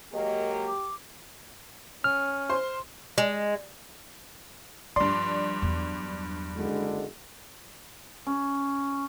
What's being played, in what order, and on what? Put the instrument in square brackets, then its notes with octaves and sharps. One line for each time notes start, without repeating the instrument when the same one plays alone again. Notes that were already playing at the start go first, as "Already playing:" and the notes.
[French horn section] F#3 G#3 A#3 [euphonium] G4 [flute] D#5
[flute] D6
[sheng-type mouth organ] C#4 [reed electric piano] F6
[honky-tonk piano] C5 C6
[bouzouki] G#3
[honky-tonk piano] G2 D5 [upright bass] F3 [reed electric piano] C6
[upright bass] E2 F#3
[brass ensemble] F#1 D3 G#3
[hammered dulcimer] C#4